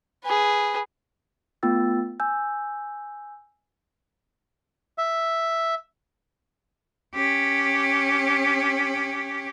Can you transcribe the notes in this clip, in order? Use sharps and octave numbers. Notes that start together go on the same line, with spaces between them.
G#4 B4
A3 B3 F4 G5 E6 A6
G#5 E6 G6
E5
C#4 G4